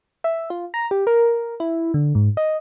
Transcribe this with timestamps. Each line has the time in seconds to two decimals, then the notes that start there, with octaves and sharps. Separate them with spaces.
0.24 E5
0.50 F4
0.74 A#5
0.91 G4
1.07 A#4
1.60 E4
1.94 D3
2.15 G#2
2.37 D#5